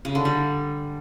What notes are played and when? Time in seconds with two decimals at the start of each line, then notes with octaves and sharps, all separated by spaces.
0.05 C#3
0.15 D3
0.25 G3